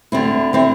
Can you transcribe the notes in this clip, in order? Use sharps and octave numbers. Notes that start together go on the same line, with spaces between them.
D2 D3 C4 E4
D3 C4 E4